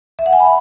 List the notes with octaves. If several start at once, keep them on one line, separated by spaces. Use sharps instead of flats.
E5
F#5
G#5
B5